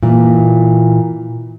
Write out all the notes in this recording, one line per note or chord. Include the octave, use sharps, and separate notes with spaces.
A#2 E3